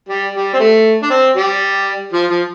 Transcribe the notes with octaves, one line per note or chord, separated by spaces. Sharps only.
G3
G3
C4
A3
D4
C4
G3
F3
F3